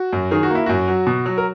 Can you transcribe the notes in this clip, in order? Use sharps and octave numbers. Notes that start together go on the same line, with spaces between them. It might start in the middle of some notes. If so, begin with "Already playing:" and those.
Already playing: F#4
F#2
D#3 G#4
F#4
A#3 E4
F#2 F#4
F#3
B2
F#3
A#4